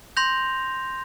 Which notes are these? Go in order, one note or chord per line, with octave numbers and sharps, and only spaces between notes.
C6 G6 A#6 F7